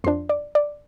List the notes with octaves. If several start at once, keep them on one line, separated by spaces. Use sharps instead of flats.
F2 F3 D4 C6
D5
D5